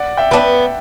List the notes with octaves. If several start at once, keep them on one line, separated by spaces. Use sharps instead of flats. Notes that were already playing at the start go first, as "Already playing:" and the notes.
Already playing: D5 F#5
E5 G5
B3 D4